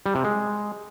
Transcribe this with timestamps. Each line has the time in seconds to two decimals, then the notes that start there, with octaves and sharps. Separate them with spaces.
0.06 G3
0.15 C3
0.24 G#3